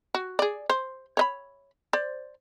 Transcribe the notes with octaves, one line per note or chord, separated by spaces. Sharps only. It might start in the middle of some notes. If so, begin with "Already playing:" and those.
F#4
G#4 D5
C5
C#5 D#5 B5
C5 D5